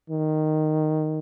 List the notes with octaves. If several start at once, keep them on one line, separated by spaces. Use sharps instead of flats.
D#3